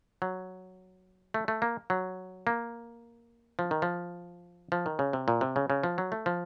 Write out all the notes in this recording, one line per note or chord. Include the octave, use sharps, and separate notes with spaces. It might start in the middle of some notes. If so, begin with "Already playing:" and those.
F#3
A3
A3
A#3
F#3
A#3
F3
D#3
F3
F3
D#3
C#3
C3
A#2
C3
C#3
C#3
F3
F#3
A3
F3